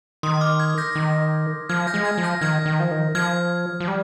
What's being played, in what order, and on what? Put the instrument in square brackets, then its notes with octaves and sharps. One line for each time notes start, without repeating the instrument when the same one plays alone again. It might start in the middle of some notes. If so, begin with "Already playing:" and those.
[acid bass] D#3 [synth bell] C6 D#6
[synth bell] D6 F6
F6 G#6
G6 A#6
[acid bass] D#3
[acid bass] F3 [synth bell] F6 G#6
[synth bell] G6 A#6
[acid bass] G#3
[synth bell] F6 G#6
[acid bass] F3
[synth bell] G6 A#6
[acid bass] D#3 [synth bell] F6 G#6
[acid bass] D#3
F3
D#3
[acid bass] F3 [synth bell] F6 G#6
[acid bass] F3
G3